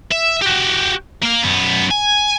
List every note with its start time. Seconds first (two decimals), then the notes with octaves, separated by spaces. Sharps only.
0.12 E5
0.42 F#4 G4
1.23 A#3 F5
1.43 F#2 B3
1.91 G#5